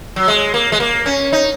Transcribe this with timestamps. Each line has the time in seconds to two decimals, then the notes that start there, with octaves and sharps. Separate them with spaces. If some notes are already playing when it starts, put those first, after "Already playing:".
0.16 F#3
0.28 G#3
0.54 A#3
0.72 G#3
0.80 A#3
1.06 C#4
1.33 D#4